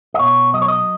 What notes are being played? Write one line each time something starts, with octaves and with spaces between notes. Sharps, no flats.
D#5
B2 C#5
F#3 D#5
C#5
D#5